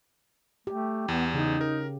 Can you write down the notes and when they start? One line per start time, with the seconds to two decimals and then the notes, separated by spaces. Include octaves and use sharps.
0.67 A3 G4
1.08 E2 B3
1.34 C#3 D#4
1.61 A#4